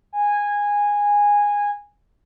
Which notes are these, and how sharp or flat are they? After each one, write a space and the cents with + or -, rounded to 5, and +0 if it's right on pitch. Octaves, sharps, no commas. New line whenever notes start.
G#5 -15